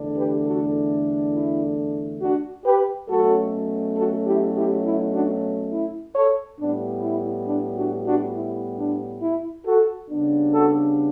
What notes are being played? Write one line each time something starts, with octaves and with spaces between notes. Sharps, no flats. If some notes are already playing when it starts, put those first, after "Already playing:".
Already playing: E2 D3 A3 D4
G4 B4
F#4 A4
E4
D4 F#4
G4 B4
B2 F#3 A3 C#4 F#4 A4
F#4 A4
E4 G4
E4 G4
E4
D4 F#4
E4
A4 C#5
A2 G3 B3 D4
E4
D4
D4 F#4
D4 F#4
E4
D4
E4
F#4 A4
C#3 G3 B3 D4
F#4 A4